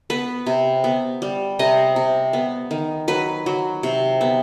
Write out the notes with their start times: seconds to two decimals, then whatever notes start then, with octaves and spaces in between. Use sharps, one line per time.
0.10 B3 B4
0.46 C3
0.84 B3
1.22 G3
1.59 C3 D#5
1.96 C3
2.33 B3
2.71 D#3
3.08 F#3 B4
3.46 F#3
3.83 C3
4.21 B3